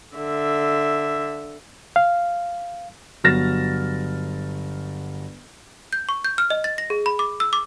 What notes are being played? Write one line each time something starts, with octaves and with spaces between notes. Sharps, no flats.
D3 E5
F5
G1 F#3 F6 A6 A#6 E7
G6
C#6
G6
F6
D#5
A6
A#6
G#4
B5
D6
E6
D6